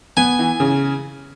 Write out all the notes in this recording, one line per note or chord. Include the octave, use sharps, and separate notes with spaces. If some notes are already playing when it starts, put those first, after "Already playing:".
B3 G#5
E3
C#3